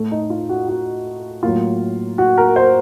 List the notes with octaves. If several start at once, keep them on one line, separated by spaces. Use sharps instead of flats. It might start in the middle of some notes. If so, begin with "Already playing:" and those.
Already playing: A2 A3
D#4
F4
F#4
F#4
A2 F#3 A#3 F4
F#4
A#4
C5